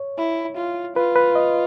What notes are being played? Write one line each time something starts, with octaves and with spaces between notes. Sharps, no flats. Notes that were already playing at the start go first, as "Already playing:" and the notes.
Already playing: C#5
E4
F4
F4 B4
B4
D#5